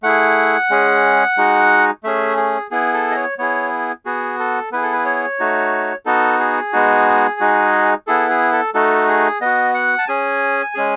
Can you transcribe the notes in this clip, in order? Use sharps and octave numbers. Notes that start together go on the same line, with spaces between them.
A3 E4 G#4 F#5
G#3 C#4 G#4
G#3 D#4 F#4
A3 C#4 G#4 E5
G#4
B3 E4 G#4
A4
D#5
C#5
B3 E4 G#4 C#5
B3 F#4 G#4
A4
B3 E4 G#4 B4
A4
B4
C#5
A3 D#4 F#4
B3 D#4 F#4 A4
G#4
G#3 B3 D#4 F#4
G#3 D#4 F#4
B3 E4 G#4 A4
G#4
A4
A3 D#4 F#4 A4
G#4
B3 F#4 D#5
F#5
A5
C#4 G#4 G#5
G#3 C#4 G#4